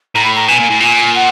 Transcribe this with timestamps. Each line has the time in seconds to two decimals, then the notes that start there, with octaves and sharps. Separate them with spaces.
0.15 A2 A#5
0.24 B5
0.36 A#5
0.48 B2 G#5
0.59 A#2
0.70 A2
0.80 A#2 G#5
1.15 F#5